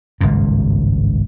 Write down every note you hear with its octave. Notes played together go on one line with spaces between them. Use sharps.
G#1 C#2 G2 A#2